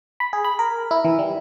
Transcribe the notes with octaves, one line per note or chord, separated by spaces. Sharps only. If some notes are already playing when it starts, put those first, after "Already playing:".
B5
G#4
B5
A#4
E4
E3
G3